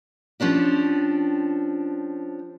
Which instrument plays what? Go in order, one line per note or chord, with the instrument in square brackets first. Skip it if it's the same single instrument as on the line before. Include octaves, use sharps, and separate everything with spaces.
[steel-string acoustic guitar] F3 C#4 D4 G4